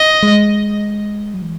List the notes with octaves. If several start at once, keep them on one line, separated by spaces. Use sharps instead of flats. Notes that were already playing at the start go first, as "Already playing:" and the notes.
Already playing: D#5
G#3
F#3
E3